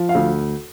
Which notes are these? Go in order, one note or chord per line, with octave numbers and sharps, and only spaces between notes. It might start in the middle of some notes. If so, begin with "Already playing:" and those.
Already playing: F3
F5
D2